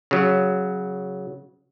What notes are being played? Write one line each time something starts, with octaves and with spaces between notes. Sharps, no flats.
C#3 F#3